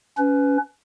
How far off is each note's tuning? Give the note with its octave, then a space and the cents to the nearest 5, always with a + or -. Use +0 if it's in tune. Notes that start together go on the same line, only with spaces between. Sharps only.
C#4 +25 B4 +15